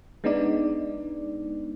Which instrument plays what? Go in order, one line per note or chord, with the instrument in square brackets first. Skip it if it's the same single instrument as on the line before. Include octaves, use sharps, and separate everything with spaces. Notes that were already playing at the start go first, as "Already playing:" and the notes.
[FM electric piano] G#3 B3 D4 D#4 D5